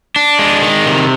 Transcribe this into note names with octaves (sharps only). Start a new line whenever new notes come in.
D4
G#3
D#3
C3